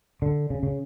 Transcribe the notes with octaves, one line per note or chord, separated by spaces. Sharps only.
D3
C#3
C#3